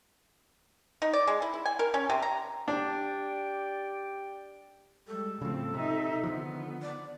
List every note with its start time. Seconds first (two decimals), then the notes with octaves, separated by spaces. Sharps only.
1.02 D#4
1.13 D5
1.27 G#3
1.42 E4
1.54 E4
1.65 G#5
1.79 A#4
1.94 C#4
2.10 C3
2.22 A#5
2.68 D4 G4 D5 G5
5.07 G3 G#3 A4
5.42 A2 C#3 F3 C4
5.74 C3 D#4 E5
6.24 D3 D#3 F3 B3
6.82 D5